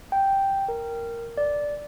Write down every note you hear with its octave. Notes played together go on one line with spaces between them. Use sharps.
G5
A#4
D5